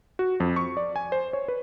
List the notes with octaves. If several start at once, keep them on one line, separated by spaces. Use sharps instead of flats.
F#4
F2
C#6
D5
G#5
C5
C#5
B4